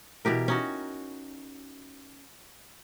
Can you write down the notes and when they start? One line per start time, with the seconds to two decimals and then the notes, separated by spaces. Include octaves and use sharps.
0.25 B2 E3 G4 A#4
0.48 C#4 D#4 F#4